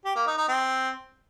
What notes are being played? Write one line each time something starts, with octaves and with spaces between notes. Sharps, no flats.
G4
A#3
D#4
D#4
C4